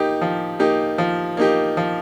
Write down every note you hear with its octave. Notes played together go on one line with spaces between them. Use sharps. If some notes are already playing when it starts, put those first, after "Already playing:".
Already playing: A#3 D#4 G4
F3
A#3 D#4 G4
F3
A#3 D#4 G4
F3